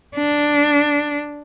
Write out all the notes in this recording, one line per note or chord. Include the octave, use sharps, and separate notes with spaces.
D4